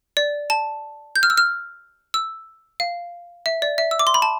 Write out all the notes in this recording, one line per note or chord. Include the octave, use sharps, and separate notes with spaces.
D5
A5
G6
F6
E6
F6
E6
F5
E5
D5
E5
E6
D6
C6
B5
A5